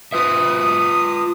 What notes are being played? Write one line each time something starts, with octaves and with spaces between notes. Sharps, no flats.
F4 B4 E5 D#6